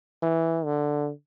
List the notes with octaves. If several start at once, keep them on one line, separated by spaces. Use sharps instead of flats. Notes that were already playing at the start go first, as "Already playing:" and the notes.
E3
D3